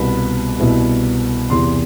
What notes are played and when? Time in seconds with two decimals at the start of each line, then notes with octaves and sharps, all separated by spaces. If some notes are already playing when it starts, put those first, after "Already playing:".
Already playing: C2 B2 B3 E4 B5
0.60 C2 B2 B3 E4
1.50 E2 C3 E3 C6